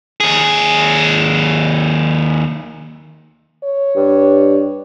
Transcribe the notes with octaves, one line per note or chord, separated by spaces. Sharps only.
D#2 G#4
C#5
G2